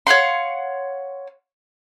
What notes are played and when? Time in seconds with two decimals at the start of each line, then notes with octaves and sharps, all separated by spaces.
0.07 C#5 F5 F#5 C6